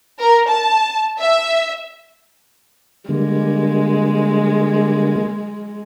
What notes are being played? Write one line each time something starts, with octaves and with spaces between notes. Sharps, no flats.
A#4
A5
E5
D3 G3 G#3 A#3